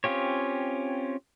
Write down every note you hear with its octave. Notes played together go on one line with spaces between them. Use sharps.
C4 C#4 F4 G4 C#5